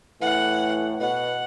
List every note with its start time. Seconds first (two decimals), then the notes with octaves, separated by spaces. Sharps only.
0.21 A2 E3 F#5
1.01 B2 F#5